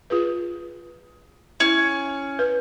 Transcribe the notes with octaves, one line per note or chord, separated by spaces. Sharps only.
F4 G#4 B4
C#4 E4
B4